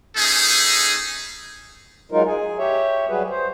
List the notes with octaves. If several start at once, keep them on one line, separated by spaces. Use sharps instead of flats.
A3 C#4 D#4 E4 G#4
F#3 G#3 D#4 F4 A#4
G#4 G#5
G4 C#5 E5
F#3 G3 F#4 G#4 B4
C5